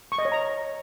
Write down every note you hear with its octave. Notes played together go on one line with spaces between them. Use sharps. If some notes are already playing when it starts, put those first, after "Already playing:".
C#6
D#5
C#5
A#5